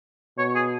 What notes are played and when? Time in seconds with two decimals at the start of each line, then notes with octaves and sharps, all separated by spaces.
0.38 B2 C#5
0.55 G#4